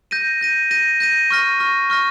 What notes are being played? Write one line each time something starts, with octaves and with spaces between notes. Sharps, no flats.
G6 A#6 D#7
G6 A#6 D#7
G6 A#6 D#7
G6 A#6 D#7
C#6 F6 A#6
C#6 F6 A#6
C#6 F6 A#6